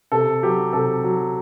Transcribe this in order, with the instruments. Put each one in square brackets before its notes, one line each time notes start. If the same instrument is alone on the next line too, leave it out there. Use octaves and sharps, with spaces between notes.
[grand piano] C3 A4
F#3 G4
C3 A4
F#3